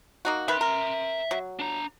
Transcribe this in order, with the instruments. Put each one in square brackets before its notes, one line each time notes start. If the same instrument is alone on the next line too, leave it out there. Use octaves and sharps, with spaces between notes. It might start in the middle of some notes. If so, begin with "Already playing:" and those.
[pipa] A#3 D#4 F#4
[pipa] D#3 B4 [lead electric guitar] E5 C6
[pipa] A#4
F#3
[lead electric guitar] D4 A#5